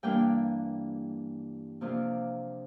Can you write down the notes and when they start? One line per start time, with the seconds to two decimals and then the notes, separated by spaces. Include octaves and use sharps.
0.03 G2 E3 A#3 D4 G5
1.81 C3 F3 A#3 D4 F4